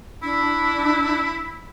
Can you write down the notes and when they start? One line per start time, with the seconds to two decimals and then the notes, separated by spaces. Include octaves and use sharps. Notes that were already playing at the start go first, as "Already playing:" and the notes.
0.23 D4 E4